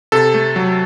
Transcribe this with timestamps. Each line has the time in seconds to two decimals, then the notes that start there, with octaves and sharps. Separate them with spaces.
0.12 C3 A4
0.34 A3
0.56 F#3